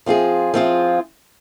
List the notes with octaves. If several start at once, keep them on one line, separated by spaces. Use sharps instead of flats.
F3 C4 F4 G#4
F3 C4 F4 G#4